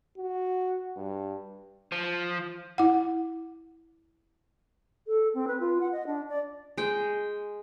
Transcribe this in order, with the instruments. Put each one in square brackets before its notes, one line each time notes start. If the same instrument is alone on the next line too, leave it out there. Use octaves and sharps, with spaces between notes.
[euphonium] F#4
G2
[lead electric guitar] F3
[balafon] E4 F#5
[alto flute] A4
C4
B4
F4
F#5
D#5
D4
D5
[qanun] G#3 G5